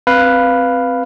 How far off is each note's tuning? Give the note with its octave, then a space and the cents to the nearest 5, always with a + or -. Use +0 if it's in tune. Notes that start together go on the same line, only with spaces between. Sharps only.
C4 +0 B4 +0 F5 +0